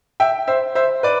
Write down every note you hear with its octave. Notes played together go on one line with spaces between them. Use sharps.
E5 G5
C5 E5
C5 E5
B4 D5